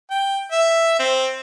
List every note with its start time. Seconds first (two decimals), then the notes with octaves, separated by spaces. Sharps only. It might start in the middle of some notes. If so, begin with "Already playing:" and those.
0.10 G5
0.52 E5
0.99 C4